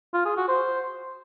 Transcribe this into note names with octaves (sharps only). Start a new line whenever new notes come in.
F4
G#4
F#4
C5